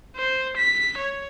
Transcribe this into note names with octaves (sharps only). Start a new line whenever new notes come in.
C5
B6
C#5